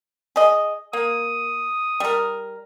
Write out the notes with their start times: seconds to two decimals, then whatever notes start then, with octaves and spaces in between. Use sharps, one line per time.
0.36 G#4 D#5
0.93 A#3 D#6
2.00 G3 A#4